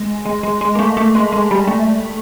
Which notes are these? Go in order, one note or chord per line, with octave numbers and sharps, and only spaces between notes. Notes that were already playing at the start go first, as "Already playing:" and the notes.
Already playing: G#3
G#3
G#3
G#3
A#3
A3
A3
G#3
G#3
G3
A3